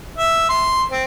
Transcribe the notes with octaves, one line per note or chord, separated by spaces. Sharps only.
E5
C6
C4